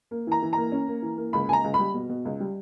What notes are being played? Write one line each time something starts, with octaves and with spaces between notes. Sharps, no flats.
A#3
E3 A#5
E3
A#3 A#5
C#4
A#3
E3
A#3
C#2 B5
C#2 G#5 A#5
C#2
B5
G3
B2
B2
C#2
G3